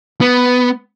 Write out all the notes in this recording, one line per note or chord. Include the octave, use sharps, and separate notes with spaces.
B3